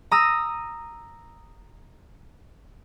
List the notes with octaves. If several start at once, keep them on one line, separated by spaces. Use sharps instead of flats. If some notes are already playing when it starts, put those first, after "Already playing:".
A#5 D#6 E6 A#6